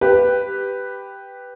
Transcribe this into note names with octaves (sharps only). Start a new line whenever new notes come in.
G4 B4